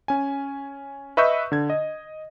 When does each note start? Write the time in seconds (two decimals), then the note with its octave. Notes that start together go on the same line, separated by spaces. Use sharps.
0.08 C#4 G#5
1.17 B4 D#5 E5 C#6 E6 G6
1.52 D3 G#6
1.70 D#5